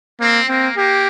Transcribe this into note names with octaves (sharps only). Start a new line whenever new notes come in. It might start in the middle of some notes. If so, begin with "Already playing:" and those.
A#3 C4
A#3 C4
A#3 G4